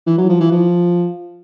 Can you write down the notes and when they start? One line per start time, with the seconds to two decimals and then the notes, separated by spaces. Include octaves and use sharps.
0.07 E3
0.18 F#3
0.29 F3
0.40 E3
0.52 F3